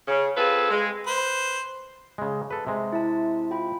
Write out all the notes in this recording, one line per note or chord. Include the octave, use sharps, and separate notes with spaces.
C#3
C4 F4 G#4 A4 B4
G#3
B4 C5
C#3 G#3
A4 B4
C3 G#3
E4 E5 A5
F4 G5 B5